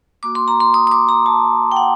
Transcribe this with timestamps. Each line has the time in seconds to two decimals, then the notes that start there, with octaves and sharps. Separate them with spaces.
0.23 A#3 F#4 D6
0.35 C6
0.48 A#5
0.60 C6
0.74 D#6
0.87 D#6
0.91 D6
1.09 A#5
1.26 A5
1.72 G5
1.76 F#5